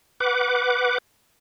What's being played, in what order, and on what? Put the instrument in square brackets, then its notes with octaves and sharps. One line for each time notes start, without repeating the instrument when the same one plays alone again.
[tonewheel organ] B4 F#5 D6